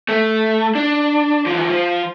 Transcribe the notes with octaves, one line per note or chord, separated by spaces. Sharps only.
A3
D4
E3 F3
F3